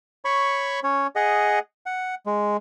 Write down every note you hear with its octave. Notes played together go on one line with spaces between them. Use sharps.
C#5 B5 C#6
C#4 C#5
G#4 D#5 F#5
F#5
G#3